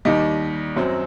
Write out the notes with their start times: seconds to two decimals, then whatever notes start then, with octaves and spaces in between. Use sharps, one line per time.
0.05 D#2 D#3 G3 D#5
0.76 F#2 F#3 C4